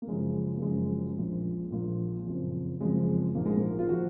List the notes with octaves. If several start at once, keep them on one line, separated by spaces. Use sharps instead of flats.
A#3
F#1 F#2 C#3 F3 G#3
A#3
F#1 F#2 C#3 F3 G#3
A#1 A#2 F3
A#1 A#2 F3
F#1 F2 F3
F#1 F2 F3 G#3
A#1 G#2 F3 A#3
G#3
A#3
F4
F3 F#4